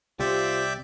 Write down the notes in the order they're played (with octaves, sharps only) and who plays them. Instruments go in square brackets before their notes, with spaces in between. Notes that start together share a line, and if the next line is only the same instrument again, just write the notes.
[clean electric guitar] C2 C3 [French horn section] C4 F4 G4 [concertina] D5 E5 G5